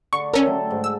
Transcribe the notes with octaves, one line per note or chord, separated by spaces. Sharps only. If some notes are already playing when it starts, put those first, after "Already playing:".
D3 C#6
C#4 A4 A#4
F#3 A3 G5
G#2
E6